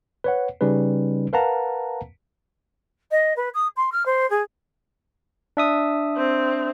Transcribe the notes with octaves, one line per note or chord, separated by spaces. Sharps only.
B4 C#5 F#5
C#3 G3 C#4 D#4 B4
A#4 B4 F5 F#5 A5 A#5
D#5
B4
D#6
C6
F6
C5
G#4
D4 E5 D#6
C4